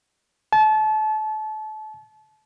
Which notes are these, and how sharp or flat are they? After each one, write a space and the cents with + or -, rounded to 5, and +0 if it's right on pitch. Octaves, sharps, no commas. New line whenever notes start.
A5 -30